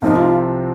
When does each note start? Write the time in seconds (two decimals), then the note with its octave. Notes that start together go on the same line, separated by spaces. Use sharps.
0.02 C2 C3 F3 C4 D#4 F4
0.16 F4